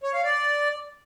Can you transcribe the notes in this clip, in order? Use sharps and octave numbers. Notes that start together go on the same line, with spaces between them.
C#5
F5
D5